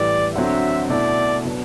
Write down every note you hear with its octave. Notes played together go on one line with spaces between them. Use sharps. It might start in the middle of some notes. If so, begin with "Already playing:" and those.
Already playing: A2 E3 G3 D5
D2 D3 F#3 C4 E5
B2 A3 E4 D5
B2 F#3 B3 D4